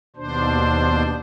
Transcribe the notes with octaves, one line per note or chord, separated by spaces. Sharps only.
D#2 B2 D4 C5